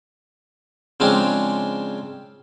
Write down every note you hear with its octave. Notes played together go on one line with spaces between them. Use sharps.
C#3 F3 G#3 C4 D4